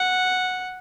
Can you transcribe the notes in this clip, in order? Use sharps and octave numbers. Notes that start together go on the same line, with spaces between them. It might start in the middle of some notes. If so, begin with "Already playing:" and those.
Already playing: F#5